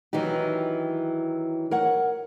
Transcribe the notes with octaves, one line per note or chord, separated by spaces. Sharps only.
D#3 E3 F#3 D#4 G4
A#4 C#5 F#5